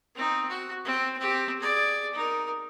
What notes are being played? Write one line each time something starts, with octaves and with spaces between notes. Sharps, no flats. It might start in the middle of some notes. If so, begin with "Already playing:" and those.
C4 D#4
F#4
C4
C4 G4
G#4 D5
D#4 A#4